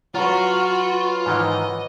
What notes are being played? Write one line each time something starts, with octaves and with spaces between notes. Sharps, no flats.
F#3 F4 F#4 B4
G#2 D#3 E3 D#5